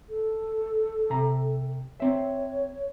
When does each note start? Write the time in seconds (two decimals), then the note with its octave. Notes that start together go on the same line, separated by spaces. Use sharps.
0.09 A4
1.10 C3 A#5
2.00 C4 C#5 E5